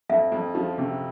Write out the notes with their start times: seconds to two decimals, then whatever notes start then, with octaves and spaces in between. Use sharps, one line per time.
0.10 F2 E5
0.32 F2
0.55 F3
0.78 C3